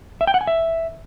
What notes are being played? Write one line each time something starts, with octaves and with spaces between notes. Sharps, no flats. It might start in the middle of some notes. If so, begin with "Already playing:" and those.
E5
G5
F#5
G#5
E5